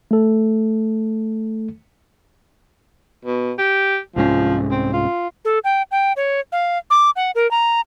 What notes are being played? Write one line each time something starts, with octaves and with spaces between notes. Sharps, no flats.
A3 A4
B2
G4
C2 G#2 F3 C#4
C4
F4
A4
G5
G5
C#5
F5
D6
F#5
A#4
A#5